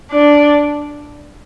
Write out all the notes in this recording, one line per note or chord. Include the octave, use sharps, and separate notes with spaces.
D4